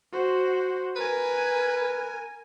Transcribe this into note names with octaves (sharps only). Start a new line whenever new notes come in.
F#4 C5
A#4 B4 G#5